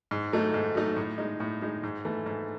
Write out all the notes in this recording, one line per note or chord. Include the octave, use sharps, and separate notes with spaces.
G#2
F#3 A3 D#4
G#2
F#3 A3 D#4
A2
G#3 D#4
A2
G#3 D#4
G#2
E3 A3
G#2